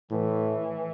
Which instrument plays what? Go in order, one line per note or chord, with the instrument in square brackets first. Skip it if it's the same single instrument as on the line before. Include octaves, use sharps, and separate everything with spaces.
[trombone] A2 [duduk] E3